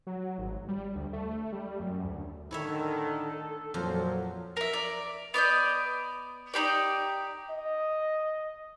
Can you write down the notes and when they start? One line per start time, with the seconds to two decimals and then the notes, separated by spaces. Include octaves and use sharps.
0.07 F#3
0.38 G#1
0.68 G3
0.95 D2
1.13 A3
1.52 G3
1.80 F#2
2.04 D2
2.51 A2 D3 D#3 E4 A4 C#5 E5
3.74 F2 A#2 F3 F#3
4.57 A#4 E5
4.73 D5
5.34 B3 D5 D#5 G6
6.54 D#4 F4 G4 D5
7.50 D#5